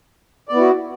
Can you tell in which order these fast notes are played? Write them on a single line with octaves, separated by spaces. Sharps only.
D5 B3 E4 F#4